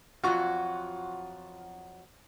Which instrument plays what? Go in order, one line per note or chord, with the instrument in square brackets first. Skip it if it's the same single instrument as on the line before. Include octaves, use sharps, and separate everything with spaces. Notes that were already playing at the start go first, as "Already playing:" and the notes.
[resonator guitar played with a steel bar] F2 F#3 F#4 [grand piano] F4 C#6